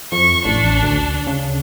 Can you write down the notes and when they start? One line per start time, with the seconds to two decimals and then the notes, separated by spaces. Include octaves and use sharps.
0.12 F2 C#6
0.45 A1 D4
0.83 D2
1.27 C#3